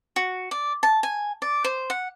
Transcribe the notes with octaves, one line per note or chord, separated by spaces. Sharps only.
F#4
D5
A5
G#5
D5
C5
F#5